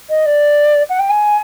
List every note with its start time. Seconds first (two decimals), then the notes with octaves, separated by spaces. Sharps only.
0.09 D#5
0.25 D5
0.89 F#5
0.99 G5
1.09 G#5